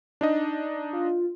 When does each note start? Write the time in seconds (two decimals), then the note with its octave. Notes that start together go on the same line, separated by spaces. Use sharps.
0.21 D4 D#4 D#5
0.93 F4